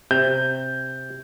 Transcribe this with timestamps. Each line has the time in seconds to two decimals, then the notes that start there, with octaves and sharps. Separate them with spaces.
0.11 C3 G6